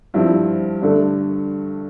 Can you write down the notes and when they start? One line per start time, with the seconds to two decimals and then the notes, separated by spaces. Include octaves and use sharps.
0.14 G2 F3 C4 E4
0.82 G2 D3 A3